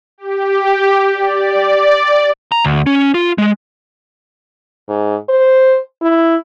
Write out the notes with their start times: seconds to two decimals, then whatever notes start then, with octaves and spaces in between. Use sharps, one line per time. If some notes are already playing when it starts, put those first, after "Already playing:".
0.18 G4
1.14 D5
2.52 A#5
2.65 D2
2.86 C#4
3.14 F4
3.38 G#3
4.88 G#2
5.29 C5
6.02 E4